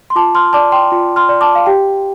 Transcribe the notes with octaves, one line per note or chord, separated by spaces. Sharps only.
C6
F4 A5 D6
C6 F6
D5 A5 D6
G5 C6
F4
C6 F6
D5
A5 D6
F5
G4 G5